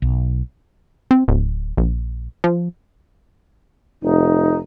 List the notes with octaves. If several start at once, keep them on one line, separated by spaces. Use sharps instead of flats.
B1
C4
D1
A#1
F3
F1 D#4